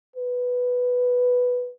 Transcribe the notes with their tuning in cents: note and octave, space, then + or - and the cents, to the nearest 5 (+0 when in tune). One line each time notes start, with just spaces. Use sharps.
B4 +0